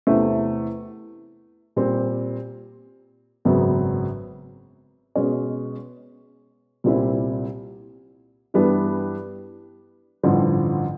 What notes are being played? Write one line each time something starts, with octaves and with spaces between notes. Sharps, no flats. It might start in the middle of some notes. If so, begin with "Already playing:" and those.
E2 C3 E3 A3 C4
A#2 G3 C4
G#1 F#2 C#3 F#3 B3
B2 G#3 C#4
C2 A#2 G3 C4 E4
G2 E3 G3 B3 D4
A1 G2 D3 F3